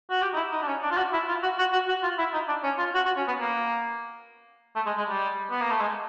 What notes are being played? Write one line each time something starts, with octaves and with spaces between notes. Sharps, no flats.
F#4
G4
D#4
E4
D#4
D4
C#4
D4
F4
F#4
E4
F4
F#4
F#4
F#4
F#4
F4
E4
D#4
D4
C#4
F4
F#4
F#4
C#4
B3
A#3
A3
G#3
G#3
G3
B3
A#3
A3
G#3